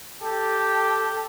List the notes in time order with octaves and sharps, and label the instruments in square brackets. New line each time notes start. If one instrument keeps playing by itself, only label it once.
[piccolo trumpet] G4 [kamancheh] A4